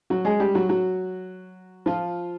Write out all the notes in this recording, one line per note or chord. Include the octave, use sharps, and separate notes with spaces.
F#3 F#4
G#3 G#4
G3 G4
F#3 F#4
F#3 F#4
F3 F4